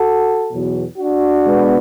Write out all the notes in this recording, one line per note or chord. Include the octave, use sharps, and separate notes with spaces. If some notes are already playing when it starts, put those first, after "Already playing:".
Already playing: F#4 A4
E2 B2 F#3
D4 F#4
B2 G#3 B3